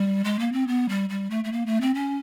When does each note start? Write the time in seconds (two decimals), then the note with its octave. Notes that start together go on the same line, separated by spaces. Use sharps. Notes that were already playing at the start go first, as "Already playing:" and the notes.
Already playing: G3
0.24 G#3
0.39 A#3
0.53 C4
0.68 B3
0.89 G3
1.10 G3
1.30 A3
1.44 A3
1.52 A#3
1.66 A3
1.81 C4
1.95 C#4